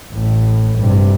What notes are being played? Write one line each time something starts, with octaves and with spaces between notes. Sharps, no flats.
A1 A2
G2 C3